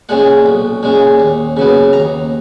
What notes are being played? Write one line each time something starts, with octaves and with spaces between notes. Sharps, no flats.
A#2 G#3 C#4 F#5
B1
A#2 G#3 C#4
D#2
C#3 F#3 B3
D#2 A#5